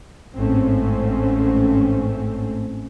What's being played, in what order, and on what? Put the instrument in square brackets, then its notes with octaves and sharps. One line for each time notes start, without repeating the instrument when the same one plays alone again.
[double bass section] A1 G#2 A3 C4 C#4